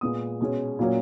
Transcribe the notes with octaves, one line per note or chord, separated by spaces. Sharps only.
A#2 G#3 B3 D#6
B2 G#3 C#4
A#2 F#3 A#3 C#4